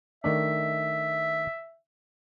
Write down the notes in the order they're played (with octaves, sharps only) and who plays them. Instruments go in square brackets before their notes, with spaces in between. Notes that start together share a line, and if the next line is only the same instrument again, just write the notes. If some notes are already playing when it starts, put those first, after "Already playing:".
[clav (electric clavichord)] D#3 A3 D4 [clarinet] E5